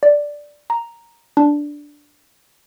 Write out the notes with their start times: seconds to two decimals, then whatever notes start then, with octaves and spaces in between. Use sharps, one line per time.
0.03 D5
0.70 A#5
1.37 D4